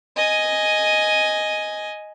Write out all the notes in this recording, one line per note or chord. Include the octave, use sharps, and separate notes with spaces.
D#5 G#5